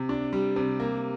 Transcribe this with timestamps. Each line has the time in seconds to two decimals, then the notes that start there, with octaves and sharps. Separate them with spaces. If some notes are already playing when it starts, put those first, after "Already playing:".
Already playing: C3
0.09 D4
0.33 G3
0.56 C3
0.80 A#3